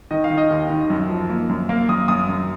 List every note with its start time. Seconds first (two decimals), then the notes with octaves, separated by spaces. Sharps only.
0.11 D#3 D#5
0.24 F5
0.30 D#3
0.38 D#5
0.50 D#2
0.70 D#3
0.90 F#2
1.09 F3
1.30 A#3
1.49 F#2
1.69 A#3 F5
1.89 F#2 D#6
2.08 F#2 D#6
2.29 F#2